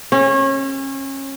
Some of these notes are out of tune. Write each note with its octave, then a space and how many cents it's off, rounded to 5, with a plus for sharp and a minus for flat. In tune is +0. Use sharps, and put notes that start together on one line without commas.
C#4 -30